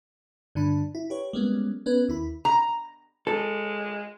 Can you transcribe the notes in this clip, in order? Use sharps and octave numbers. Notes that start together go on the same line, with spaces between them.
G2 D3 D4 B5
E4
G4 B4 C#5
G3 G#3 A#3 B3 C#4
B3 C#4 B4
D#2 E4 B5
A#5
G#3 A4